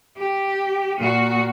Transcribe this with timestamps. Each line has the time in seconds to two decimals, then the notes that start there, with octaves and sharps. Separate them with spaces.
0.17 G4
0.98 A#2 F#4